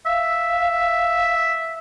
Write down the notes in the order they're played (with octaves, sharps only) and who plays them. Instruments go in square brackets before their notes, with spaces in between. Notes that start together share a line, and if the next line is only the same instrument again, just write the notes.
[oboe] E5 [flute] F5